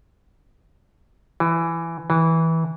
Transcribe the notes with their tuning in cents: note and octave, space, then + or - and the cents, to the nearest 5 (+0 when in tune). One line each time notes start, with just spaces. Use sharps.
E3 +15
E3 -15